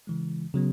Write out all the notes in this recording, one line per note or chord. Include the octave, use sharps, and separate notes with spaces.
C#3 E3 G#3
C#3 F#3 B3